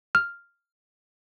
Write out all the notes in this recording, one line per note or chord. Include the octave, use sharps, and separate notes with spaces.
F6